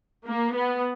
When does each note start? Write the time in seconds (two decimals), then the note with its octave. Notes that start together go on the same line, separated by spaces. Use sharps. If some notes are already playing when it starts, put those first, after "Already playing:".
0.27 A#3
0.55 B3